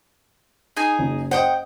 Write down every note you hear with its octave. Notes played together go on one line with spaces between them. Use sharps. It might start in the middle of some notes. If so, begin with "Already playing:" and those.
D#4 G#4 G#5
F#1
C5 D#5 F#5 G5 D#6